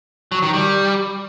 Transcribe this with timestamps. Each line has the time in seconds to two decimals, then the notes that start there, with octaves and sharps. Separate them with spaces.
0.32 F#3
0.42 D#3
0.53 G3